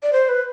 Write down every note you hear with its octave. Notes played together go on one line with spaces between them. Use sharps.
D5
C5
B4